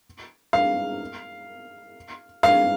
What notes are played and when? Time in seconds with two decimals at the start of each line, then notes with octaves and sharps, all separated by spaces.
0.53 F5
2.43 F5